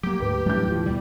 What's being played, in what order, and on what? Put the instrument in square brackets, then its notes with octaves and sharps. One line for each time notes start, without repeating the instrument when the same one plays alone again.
[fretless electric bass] F#3 A#3 [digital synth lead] G4
[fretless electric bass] D2 G#2 [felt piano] B4
[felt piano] A1 E4 G6 [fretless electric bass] F#3 G3 D4
[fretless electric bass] D#2 F3
[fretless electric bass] B2 D#3 [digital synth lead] G3